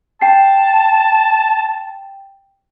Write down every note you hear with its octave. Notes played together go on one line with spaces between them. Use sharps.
G5 A5 C7